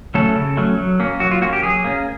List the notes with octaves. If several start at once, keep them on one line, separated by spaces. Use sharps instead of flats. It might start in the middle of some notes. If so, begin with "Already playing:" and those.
F#3 A3 C#4 A4
C#3
F#3 A3 C#4
F#3
A#3 C#4
F#3 F#4
F4
A#3 C#4 F#4
G4
F#3 G#4
A#3 C#4